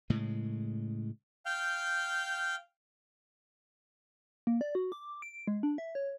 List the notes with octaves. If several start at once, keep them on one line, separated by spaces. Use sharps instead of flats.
A2 C#3 G#3
F5 G5 F6 G6
A#3
D5
F#4
D6
D7
G#3
D4
E5
C#5